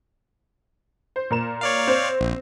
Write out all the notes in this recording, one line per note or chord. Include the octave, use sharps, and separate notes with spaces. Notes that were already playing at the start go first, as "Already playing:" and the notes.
C5
A#2 A#4 E7
C#5 D5 F5
C4 C5
A#1